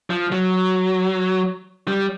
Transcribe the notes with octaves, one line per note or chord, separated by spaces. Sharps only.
F3
F#3
G3